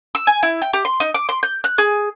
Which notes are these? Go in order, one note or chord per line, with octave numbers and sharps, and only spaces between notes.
E6
G#5
E4
G5
G4
C6
D#4
D6
C6
G6
F#6
G#4